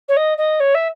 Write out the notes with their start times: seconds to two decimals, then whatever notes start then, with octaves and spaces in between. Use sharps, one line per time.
0.08 C#5
0.16 D#5
0.38 D#5
0.60 C#5
0.74 E5